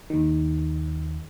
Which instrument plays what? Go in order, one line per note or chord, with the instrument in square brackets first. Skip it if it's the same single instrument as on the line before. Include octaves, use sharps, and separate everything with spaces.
[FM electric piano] D#2 D#3